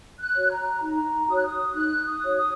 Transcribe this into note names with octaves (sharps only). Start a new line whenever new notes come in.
F#6
F#4 C#5
A#5
D#4 A#5
F#4 C#5 D#6
F#6
D#6
D#4 F#6
D#6
F#4 C#5
D#6